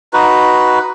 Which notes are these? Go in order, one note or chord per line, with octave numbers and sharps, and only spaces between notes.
D#4 F#4 B4